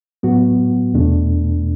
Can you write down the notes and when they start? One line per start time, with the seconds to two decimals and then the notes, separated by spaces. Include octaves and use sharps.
0.23 A2 F#3 B3 F#4
0.94 E2 B2 A3 D4